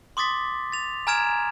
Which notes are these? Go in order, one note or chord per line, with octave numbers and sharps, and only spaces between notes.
C6 D6 D#6 A6 B6
A6 F7
G#5 A#5 F6 G#6 D7 E7